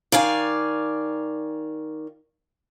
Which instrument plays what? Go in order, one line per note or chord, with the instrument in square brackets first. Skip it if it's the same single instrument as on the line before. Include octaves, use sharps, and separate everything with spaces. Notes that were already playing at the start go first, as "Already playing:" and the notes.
[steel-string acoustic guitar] D#3 D5 F5 G#5